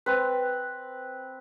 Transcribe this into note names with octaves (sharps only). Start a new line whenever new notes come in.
C4 B4